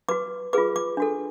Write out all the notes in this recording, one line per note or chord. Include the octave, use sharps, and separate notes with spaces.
F#4 B4 D6
F4 G#4 B4 D6
D6
D4 F#4 A4